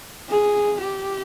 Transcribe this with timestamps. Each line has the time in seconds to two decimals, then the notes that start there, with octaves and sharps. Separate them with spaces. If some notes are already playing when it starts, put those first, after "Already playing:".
0.29 G#4
0.80 G4